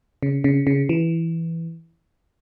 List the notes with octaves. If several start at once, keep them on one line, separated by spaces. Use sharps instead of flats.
C#3
C#3
C#3
E3